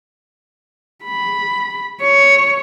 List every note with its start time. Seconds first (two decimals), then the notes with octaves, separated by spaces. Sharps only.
1.05 B5
2.02 C#5